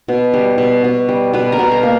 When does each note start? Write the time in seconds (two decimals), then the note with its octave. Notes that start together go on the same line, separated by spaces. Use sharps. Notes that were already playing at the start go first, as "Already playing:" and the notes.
0.08 B2
0.34 G3
0.58 B2
0.84 B2
1.09 G3
1.33 B2 B4 B5
1.52 A#4 A#5
1.59 B2
1.71 A#4 A#5
1.83 A#3